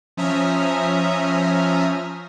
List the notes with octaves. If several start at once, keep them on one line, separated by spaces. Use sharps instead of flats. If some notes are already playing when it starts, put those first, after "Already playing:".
F3 C#4 E5 A#5 D#6 F6